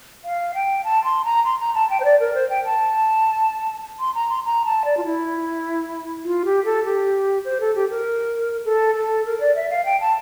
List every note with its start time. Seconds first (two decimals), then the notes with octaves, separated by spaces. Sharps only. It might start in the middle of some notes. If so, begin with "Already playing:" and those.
0.25 F5
0.55 G5
0.84 A5
1.04 C6
1.25 A#5
1.45 C6
1.60 A#5
1.75 A5
1.90 G5
2.00 C5
2.05 D5
2.20 A#4
2.34 C5
2.50 G5
2.65 A5
4.00 C6
4.15 A#5
4.29 C6
4.45 A#5
4.65 A5
4.85 D5
4.97 F4
5.05 E4
6.25 F4
6.45 G4
6.65 A4
6.85 G4
7.45 C5
7.60 A4
7.75 G4
7.90 A#4
8.65 A4
8.95 A4
9.26 A#4
9.40 D5
9.55 E5
9.70 F5
9.85 G5
10.01 A5